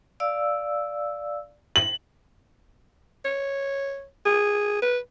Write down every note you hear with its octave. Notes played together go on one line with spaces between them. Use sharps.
D5 F5 E6
F#7
C#5
G#4
B4